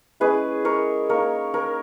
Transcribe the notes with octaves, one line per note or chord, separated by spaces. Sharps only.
G#3 C#4 E4 G#4 B4
A#4 C#5
A#3 D#4 A#4 C#5
A#4 C#5